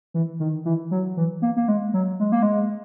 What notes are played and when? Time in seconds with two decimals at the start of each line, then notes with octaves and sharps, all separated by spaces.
0.14 E3
0.40 D#3
0.65 E3
0.91 F#3
1.17 E3
1.42 A#3
1.57 A#3
1.68 G#3
1.94 F#3
2.20 G#3
2.32 A#3
2.43 G#3